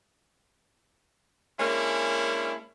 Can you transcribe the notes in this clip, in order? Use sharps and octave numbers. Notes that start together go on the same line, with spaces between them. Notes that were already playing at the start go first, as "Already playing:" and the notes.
G#3 A#3 C#4 D4 E4